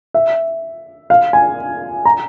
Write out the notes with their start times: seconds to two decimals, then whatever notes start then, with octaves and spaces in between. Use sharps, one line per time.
0.14 E5
1.10 F5
1.33 G#5
2.05 A#5